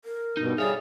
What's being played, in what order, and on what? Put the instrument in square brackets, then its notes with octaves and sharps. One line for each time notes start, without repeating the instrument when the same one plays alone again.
[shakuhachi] A#4
[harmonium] G2 B2 [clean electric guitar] D#4
[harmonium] G3 G#4 [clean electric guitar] A4 C#5 F5 [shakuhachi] E5